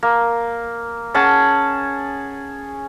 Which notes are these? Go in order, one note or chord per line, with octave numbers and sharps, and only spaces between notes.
A#3
C#4 G#4 F#5 A5